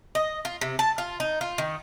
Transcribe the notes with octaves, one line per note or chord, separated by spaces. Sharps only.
D#5
F4
C3
A5
F4
D#4
F4
D#3